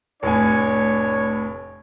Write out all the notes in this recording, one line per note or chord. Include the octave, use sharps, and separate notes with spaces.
F1 A2 D4 C#5 G#5